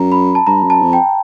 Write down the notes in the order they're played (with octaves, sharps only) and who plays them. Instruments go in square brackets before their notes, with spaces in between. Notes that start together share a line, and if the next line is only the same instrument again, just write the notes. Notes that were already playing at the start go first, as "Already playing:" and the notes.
Already playing: [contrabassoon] F#2 [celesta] A#5
[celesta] B5
A5
[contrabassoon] G2 [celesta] A#5
[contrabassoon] F#2
[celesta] A5
[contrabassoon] F2
[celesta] G5